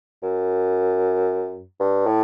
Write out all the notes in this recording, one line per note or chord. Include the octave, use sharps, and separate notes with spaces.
F#2
G2
A2